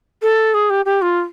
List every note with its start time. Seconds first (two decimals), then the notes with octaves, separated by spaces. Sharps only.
0.22 A4
0.54 G#4
0.70 G4
0.85 G4
1.02 F4